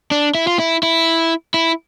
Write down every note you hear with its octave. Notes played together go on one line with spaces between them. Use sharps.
D4
E4
F4
E4
E4
E4